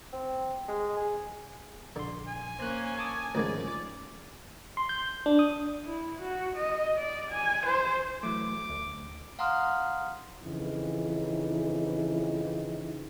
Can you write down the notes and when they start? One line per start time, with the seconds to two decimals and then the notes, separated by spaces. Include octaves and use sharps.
0.13 C4
0.68 G#3
0.96 G#4
1.96 A#1 D3 C6
2.27 G#5
2.59 A#3 C#4 C5 F#6
2.98 A5 D6 D#6
3.35 D2 G#2 D#3 F3 G#3 C#4 D5
4.77 C6
4.89 G6
5.26 D4
5.39 D#6
5.84 E4
6.21 F#4
6.56 D#5
6.98 D5
7.32 G#5
7.66 C5
8.23 E3 F#3 A3 D6
8.69 D2
9.39 F5 F#5 A#5 C6 D#6 F6
10.42 F2 C#3 E3 D#4